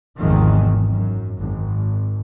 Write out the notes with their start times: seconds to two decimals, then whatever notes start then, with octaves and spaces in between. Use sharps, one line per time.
0.17 G#1 E2 G#2 C3 D#3 F3
0.92 F#2
1.38 G#1